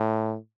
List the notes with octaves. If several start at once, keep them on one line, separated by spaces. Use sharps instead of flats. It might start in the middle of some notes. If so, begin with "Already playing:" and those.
Already playing: A2